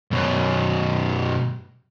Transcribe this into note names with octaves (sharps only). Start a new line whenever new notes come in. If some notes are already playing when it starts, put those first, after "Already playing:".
F#2 B2